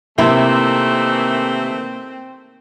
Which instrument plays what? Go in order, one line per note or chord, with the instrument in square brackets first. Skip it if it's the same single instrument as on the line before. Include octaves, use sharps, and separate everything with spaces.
[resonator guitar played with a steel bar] C3 E4 [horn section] D#3 E3 A3 [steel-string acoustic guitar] A#3 [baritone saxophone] C4